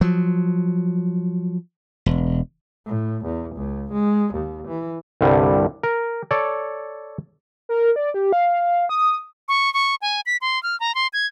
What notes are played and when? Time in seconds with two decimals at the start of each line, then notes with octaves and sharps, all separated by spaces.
0.01 F3 F#3
2.06 E1
2.87 A2
3.25 E2
3.56 C#2
3.93 G#3
4.34 D#2
4.68 E3
5.21 C2 G2 D3 G3
5.83 A#4
6.31 A4 C#5 D5
7.69 A#4
7.96 D5
8.14 G4
8.33 F5
8.89 D#6
9.48 C#6
9.74 C#6
10.02 G#5
10.26 B6
10.41 C6
10.63 F6
10.80 A#5
10.95 C6
11.13 G#6